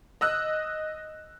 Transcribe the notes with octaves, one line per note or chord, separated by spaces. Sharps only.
D#5 E6 F#6